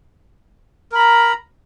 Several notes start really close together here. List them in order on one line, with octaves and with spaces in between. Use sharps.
A#4 B5 A#5